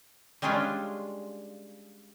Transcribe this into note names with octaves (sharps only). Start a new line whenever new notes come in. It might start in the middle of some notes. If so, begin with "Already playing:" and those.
G3 G#3 C#4 D4 F4